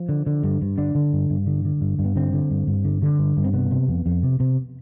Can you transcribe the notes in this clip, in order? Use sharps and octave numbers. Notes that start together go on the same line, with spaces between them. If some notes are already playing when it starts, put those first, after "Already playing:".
Already playing: F3
D3
D3
G2
G2
D3 D4
D3
G2
G2
D3
D3
G2
G2
B3
D3 C4
D3
G2
G2
D3
D3
G2
G2
C4
C3 B3
C3
F2
F2
C3
C3